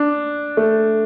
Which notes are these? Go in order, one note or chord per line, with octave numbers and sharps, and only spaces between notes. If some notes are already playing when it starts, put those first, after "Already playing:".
Already playing: D4
A3